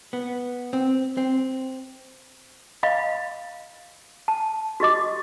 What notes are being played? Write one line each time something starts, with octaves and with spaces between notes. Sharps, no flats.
B3
C4
C4
D#5 F5 B5
A5
F#4 G4 D#5 D6